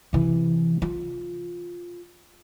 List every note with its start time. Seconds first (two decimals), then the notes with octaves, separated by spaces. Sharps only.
0.13 C3 E3
0.82 F4